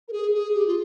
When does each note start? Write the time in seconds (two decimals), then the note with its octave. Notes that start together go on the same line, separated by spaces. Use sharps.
0.08 A#4
0.13 G#4
0.34 G#4
0.55 G4
0.67 F4